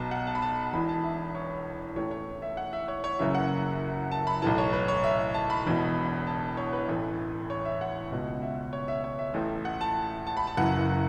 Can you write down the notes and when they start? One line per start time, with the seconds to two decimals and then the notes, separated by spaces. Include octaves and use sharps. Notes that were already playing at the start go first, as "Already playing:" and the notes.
Already playing: B1 B2 A5
0.11 F#5
0.27 A5
0.35 B5
0.42 A5
0.73 E1 E2 E3 B5
0.89 A5
1.03 E5
1.35 C#5
1.96 A1 A2 E3 C#5
2.11 C#5
2.42 E5
2.57 F#5
2.73 E5
2.88 C#5
3.04 C#5
3.19 F#1 F#2 C#3 E3 E5
3.35 F#5
4.11 A5
4.27 B5
4.42 B1 A2 E3 A5
4.58 C#5
4.73 B4
4.88 C#5
5.04 E5
5.34 A5
5.50 B5
5.66 E1 E2 B2
6.27 A5
6.57 C#5
6.73 B4
6.88 A1 A2 E3
7.50 C#5
7.65 E5
7.81 F#5
8.11 C#2 B2
8.42 E5
8.73 C#5
8.88 E5
9.04 C#5
9.19 E5
9.34 A1 A2 E3
9.65 F#5
9.81 A5
10.27 A5
10.37 B5
10.47 A5
10.57 F#1 F#2 E3 F#5